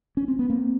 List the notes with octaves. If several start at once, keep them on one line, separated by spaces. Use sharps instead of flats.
C#4
C4
B3
A#3 C4